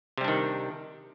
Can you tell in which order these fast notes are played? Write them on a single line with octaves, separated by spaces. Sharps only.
C3 G3 D4 D#3